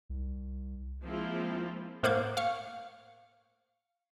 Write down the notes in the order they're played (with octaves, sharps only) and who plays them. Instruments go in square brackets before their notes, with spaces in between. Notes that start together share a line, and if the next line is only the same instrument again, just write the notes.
[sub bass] C2
[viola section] F3 G#3 A#3 C4 E4 F4
[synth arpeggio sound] A2 A#3 C5 F#5 D6 G#6
F5 C#6